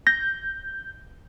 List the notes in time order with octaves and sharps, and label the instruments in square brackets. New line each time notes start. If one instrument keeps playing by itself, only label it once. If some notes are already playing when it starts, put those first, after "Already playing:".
[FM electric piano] G6 [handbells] A#6